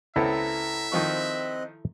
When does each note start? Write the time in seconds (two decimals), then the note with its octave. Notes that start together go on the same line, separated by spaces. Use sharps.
0.16 C#2 B3 C4 E4 A4 E5 A#5
0.92 D#3 F3 C4 D#5 C#6 F#6